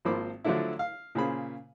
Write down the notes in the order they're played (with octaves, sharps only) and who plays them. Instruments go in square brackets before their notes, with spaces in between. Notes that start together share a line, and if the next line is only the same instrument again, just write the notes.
[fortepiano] G#1 F3 A#3 C5 B5 D6
D3 F3 F#3 A3 D4 E4
F5
A#2 C#3 G#4 C5 B5